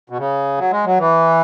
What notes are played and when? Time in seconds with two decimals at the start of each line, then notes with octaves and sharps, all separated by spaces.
0.10 B2
0.18 C#3
0.58 F#3
0.71 G#3
0.85 F#3
0.98 E3